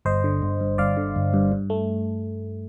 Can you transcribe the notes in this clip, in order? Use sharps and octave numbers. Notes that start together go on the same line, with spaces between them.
G1 C5 D#5
D3
G1
G2
G1 D5 F5
D3
G1
G2
G2
A3